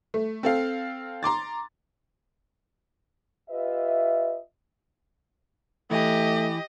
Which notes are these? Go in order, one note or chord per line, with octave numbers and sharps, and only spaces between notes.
A3
C4 A4 F5
A#5 C6 D6 A6
F4 G4 B4 D#5 E5
E3 A3 G4 D#5